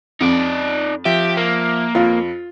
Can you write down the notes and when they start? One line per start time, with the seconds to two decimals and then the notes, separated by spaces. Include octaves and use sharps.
0.21 F2 D#4 D5
1.05 F3 G4 E5
1.37 A#3
1.95 F2 F4